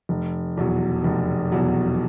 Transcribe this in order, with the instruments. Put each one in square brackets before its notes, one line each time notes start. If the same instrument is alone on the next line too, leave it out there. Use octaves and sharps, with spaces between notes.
[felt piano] F1
E2 B2 F#3
F1
E2 B2 F#3